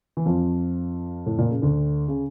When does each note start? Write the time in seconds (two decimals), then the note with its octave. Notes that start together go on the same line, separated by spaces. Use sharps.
0.17 E3
0.26 F2 F3
1.26 A2
1.39 A#2
1.50 C#3
1.62 D2 D3
2.08 C#3